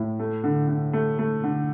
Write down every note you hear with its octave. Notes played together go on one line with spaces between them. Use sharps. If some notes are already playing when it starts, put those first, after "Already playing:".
Already playing: A2
A3
D3
D3
A3
A3
D3